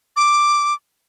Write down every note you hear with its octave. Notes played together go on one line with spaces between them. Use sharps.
D6